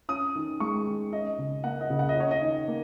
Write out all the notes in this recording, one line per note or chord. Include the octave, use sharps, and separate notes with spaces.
C#4 D#6
D#3
G#3 C#6
D#3
C#4 D#5
C#3
A#3 F#5
D#5
C#3
F#5
D#5
C#4 C#5
D#5
D#3
A#3